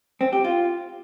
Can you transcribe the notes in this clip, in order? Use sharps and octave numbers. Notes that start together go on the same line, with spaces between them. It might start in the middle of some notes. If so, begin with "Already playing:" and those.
C4
G4
F4